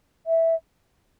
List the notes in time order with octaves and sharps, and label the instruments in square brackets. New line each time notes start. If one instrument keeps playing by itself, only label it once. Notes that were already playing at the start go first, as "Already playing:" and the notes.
[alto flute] E5